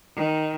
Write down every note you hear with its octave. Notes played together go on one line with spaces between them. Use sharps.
D#3